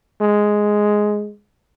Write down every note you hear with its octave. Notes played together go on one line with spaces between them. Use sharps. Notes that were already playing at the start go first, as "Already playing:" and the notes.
G#3